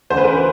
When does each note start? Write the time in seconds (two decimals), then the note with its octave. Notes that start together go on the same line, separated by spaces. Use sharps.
0.10 D2 C#3 E3 C5
0.17 B4
0.24 A#4
0.32 B4